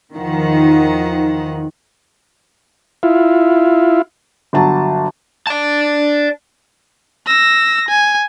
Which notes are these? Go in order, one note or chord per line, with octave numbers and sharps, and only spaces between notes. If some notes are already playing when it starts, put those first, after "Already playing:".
E2 D#3 F3 F#5
E4 F4
G1 F#3 A5
D5 A5
E6 A#6
G#5